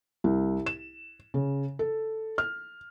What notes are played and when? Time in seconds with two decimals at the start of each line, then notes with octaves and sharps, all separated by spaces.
0.24 C2
0.66 E7
1.34 C#3
1.79 A4
2.38 F6